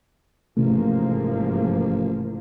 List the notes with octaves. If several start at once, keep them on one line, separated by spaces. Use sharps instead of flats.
A1 G#2 C3 F3 A3 A#3